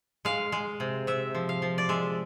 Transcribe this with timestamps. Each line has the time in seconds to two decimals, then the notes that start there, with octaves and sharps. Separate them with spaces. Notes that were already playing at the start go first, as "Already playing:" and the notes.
0.25 G#3 F5
0.52 G#3
0.80 C3
1.07 C3 E5
1.35 F3
1.49 F5
1.62 F3
1.78 D5
1.89 G#3 E5